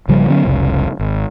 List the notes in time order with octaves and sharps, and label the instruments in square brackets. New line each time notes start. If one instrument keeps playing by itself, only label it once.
[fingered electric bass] G#1 C#3 F3 G3
D3 F#3 B3 C#4
F1 C2 C#3
G#1